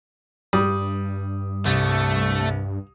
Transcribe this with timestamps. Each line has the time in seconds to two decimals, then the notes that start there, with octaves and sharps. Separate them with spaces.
0.53 G2 G3 D#6
1.66 C2 A3